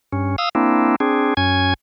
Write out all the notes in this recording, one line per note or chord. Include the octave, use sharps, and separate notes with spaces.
G2 C#4
F5 D#6 E6
A#3 C4 D4 E4
C4 D4 G#4
F#2 C#4 G#5 G#6